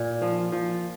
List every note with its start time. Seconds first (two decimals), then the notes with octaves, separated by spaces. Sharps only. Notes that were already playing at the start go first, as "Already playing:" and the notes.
Already playing: A#2
0.22 F3
0.52 F3